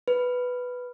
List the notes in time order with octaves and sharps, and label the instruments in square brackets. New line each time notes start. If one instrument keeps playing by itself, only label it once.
[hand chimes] B4